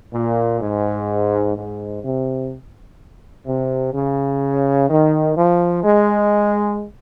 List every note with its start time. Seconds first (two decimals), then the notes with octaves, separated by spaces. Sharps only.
0.13 A#2
0.61 G#2
1.55 G#2
2.04 C3
3.46 C3
3.93 C#3
4.89 D#3
5.37 F3
5.84 G#3